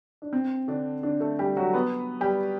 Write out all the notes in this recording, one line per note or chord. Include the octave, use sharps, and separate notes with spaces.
D4
C4
D3 D4
D3 D4
A3 A4
G3 G4
F#3 F#4
B3 B4
G3 G4